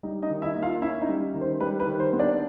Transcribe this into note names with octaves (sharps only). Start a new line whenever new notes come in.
G3 D#4 D#5
D#4 D#5
D#3
E4 E5
A#3
F4 F5
C#4 E4 E5
D#4 D#5
G3
D#3
C5
G3 B4
B4
D#3
C5
B3
D4 D5